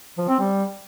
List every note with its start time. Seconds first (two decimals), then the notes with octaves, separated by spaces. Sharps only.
0.18 F3
0.29 C4
0.39 G3